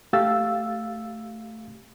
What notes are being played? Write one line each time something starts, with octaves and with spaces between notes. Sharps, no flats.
A3 G4 F5 E6 A6